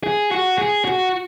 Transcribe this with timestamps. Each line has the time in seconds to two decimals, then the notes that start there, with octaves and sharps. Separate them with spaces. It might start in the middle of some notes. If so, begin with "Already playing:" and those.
0.03 G#4
0.31 F#4
0.58 G#4
0.85 F#4